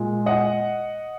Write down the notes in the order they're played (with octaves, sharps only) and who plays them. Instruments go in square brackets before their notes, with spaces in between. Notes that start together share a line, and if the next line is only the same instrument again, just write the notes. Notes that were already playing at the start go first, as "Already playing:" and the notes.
Already playing: [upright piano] A#2 G#3
D#5 F#5